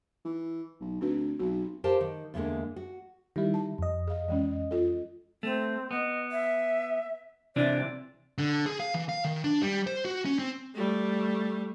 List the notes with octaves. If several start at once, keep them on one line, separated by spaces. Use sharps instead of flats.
E3
B1
D2 C4 F#4 B4
B1 F#4
G4 A#4 C5 F5 A5
D#3
E2 D3 E3 F3 G#3 A#3
F#4
D#3 G3 E4 G4
A5
F2 D#5
G#4 F5
E3 G#3 C#4
F4 A4
A3 C4
B3 D#5
E5
C3 E3 D4 D5
D3
G#4
F5
E3
F5
D#3
D4
G3
C5
F#4
C#4
C4
G3 A3